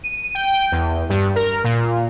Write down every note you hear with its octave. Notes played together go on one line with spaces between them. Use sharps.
D#7
G5
E2
G2
A#4
A#2